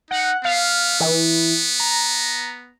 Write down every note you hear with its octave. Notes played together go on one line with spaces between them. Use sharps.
D#4 F#5
B3 F5
E3
A#5